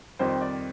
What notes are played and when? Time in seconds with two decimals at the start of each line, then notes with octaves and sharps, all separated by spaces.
0.19 F2 D#3 G3 C4 C5
0.41 D5